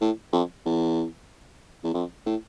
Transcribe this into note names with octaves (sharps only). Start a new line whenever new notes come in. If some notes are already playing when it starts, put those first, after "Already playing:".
A2
F2
E2
E2
F2
A2